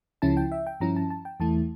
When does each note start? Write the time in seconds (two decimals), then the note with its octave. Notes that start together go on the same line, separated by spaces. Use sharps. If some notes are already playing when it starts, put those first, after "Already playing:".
0.22 C#2 C#3 F3 C#4 E4 A5
0.37 G5
0.52 E5
0.67 G5
0.80 G2 F3 C#4 E4 A#5
0.96 A5
1.10 A5
1.25 G5
1.40 E2 E3 A3 E4 A5